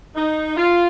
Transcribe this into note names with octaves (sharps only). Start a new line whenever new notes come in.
D#4
F4